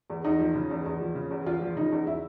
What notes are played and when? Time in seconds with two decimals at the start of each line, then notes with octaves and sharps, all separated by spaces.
0.10 E2
0.24 E2 D#4
0.39 F3
0.55 C#3
0.71 E2
0.86 E2
1.00 F3
1.15 C#3
1.31 E2
1.46 E2 F4
1.61 F3
1.76 C#3 D#4
1.92 E2
2.07 E4